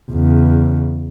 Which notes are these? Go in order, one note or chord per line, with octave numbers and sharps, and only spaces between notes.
E2 C#3